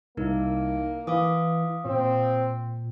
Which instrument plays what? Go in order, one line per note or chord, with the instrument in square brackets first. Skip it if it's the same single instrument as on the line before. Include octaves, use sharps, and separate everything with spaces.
[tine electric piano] C2 [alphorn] A#3 [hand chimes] D#4 E4 A#4
[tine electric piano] E3 [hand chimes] F5 D6 D#6
[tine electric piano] A#2 [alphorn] C4